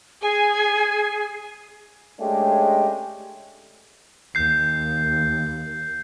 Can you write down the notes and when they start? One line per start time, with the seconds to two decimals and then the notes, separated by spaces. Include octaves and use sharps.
0.22 G#4 G#5
2.20 G#3 A3 C#4 D4 G4
4.35 D#2 G6 C7